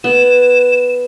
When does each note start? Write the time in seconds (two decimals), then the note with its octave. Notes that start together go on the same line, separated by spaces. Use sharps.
0.04 B3 E7